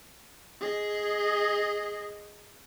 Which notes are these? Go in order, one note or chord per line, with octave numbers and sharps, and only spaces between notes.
G#4 D#5